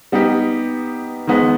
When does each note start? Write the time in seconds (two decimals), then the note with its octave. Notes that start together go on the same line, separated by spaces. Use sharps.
0.12 G3 B3 D#4 G4
1.27 D#3 G#3 B3